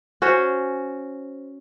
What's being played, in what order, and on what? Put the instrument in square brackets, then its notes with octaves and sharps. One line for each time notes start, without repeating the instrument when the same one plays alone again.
[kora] C#4 F#4 C5